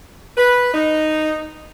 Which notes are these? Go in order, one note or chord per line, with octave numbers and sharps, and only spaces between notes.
B4
D#4